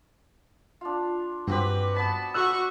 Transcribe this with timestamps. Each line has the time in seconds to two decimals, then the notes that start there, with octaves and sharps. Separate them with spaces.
0.81 D4 F4
1.48 G2 C4 F#4 G4 B4
1.96 B3 A5 B5
2.34 F#4 C#6 E6 F#6